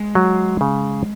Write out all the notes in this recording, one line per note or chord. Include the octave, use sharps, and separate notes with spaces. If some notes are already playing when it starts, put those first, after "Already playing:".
Already playing: G#3
F#3
C#3